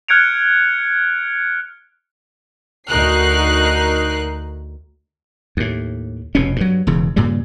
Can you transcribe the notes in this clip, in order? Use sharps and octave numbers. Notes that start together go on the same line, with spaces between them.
F6 F#6 G#6 C#7 D7 F7
D2 D#4 F#4 A#4 F#6 C7
D#2 A2
F1 F2 B2 C#4
G2 F#3
E1 E2 C#3
G2 A#2 C#3 G3